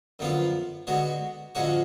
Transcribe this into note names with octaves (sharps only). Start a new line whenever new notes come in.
F#2 D3 F3 B3 F4
D3 G#3 B3 F#4
F2 D3 G#3 C#4 F#4